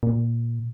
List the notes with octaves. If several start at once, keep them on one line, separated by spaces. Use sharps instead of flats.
A#2